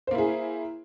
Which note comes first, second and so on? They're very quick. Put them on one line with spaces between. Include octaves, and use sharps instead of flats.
C5 A#3 E4 G#4